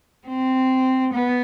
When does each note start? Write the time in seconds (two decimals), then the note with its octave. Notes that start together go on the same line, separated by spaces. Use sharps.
0.27 C4
1.14 B3